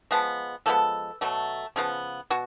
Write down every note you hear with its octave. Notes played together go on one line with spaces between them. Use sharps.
F3 G#3 B3
F3 G#3 B3 A4
B2 F#3 A3
C#3 F3 B3
B2 F#4